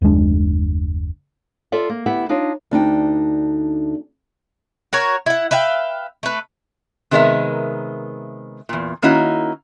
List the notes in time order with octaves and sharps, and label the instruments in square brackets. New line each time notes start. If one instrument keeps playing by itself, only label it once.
[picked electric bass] F#1 D#2 G#3 D4
[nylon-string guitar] F4 A4 D5 E5
A#3
D2 B3 E4 G4 E5
D4 D#4 F4 C#5
D2 D4 D#4 G5
[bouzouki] F#4 A#4 C#5
E4 F#5
B4 E5 F5 G5
A3 B4
[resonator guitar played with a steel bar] C3 D#3 G#3 B3 A#4 E5
E2 A#2
D#3 A#3 C#4 D#4 E4 F#4